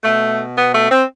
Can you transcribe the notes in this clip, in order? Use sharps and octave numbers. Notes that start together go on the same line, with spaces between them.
B2 A3
B3
A3
C4